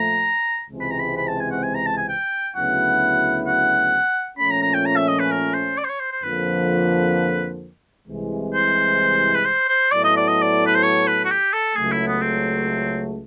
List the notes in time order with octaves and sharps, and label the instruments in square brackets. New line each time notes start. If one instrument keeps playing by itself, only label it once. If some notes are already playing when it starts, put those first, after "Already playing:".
Already playing: [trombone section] A#2 F3 A3 [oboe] A#5
[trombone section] C#2 C3 E3 G#3 C4
[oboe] B5
A#5
B5
B5
A5
G#5
F#5
G#5
A#5
A5
G#5
G5
[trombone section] D2 C#3 F#3 B3 E4 [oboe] F#5
[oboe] F#5
[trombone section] A#2 F3 A3 C#4 [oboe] B5
[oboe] A#5
A#5
G5
A#5
E5
D#5
B4
A#4
C5
D5
C5
C#5
C5
C5
[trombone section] F2 D3 F3 A#3 [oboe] B4
[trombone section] C2 C3 E3 G#3
[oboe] C5
B4
C5
C5
[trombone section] A2 F#3 B3 E4 A4 [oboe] D5
[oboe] D#5
D5
D#5
D5
B4
C5
C#5
B4
F#4
G4
A4
[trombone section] C#2 C#3 F#3 A3 [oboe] G#4
[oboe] E4
B3
C4